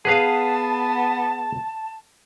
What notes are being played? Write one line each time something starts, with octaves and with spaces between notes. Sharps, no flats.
B3 G#4 B4 F5 A5